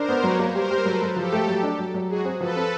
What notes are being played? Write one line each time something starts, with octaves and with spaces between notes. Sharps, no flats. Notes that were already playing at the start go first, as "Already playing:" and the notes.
Already playing: D4 A#4 C5
B3
F#3 B4 C#5
A#3
G3 A#4 C5
G3
F#3 A4 B4
F#3
F3 G4 A4
A3
F#3
D4
F#3
F#3
G#3 F#4 G#4
C4
F3 A4 B4
C4